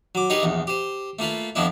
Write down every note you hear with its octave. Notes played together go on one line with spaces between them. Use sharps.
F#3 D6
D#4 G4 G#4 A#4 B4
A#1 E2
G4 C5
A3 A#3 F4 B4
F2 F3 B3 C4 D4 E4